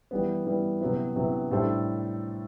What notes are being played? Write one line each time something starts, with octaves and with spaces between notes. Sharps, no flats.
E3 G3 B3
E3 G3 B3
C3 F#3 B3 E4
C3 F#3 B3 E4
A2 G3 D4 A4 C5